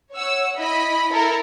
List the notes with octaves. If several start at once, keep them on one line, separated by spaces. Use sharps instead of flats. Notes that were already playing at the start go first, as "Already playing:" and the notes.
C#5 F#5 E6
E4 D#5 B5
E4 A4 A#4